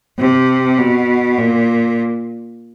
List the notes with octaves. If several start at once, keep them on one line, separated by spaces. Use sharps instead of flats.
C3
B2
A#2